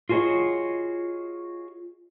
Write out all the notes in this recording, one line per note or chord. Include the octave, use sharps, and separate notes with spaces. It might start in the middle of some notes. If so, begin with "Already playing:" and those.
F4 F#4 G#4 A#4 C#5 D#5